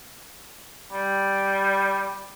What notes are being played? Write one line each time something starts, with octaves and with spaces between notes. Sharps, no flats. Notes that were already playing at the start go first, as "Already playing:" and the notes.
G3